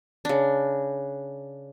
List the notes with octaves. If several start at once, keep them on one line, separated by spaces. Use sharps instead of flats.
C#3 D4